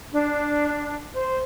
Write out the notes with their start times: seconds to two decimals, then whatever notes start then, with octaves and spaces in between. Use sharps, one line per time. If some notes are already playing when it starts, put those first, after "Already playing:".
0.12 D4
1.14 C5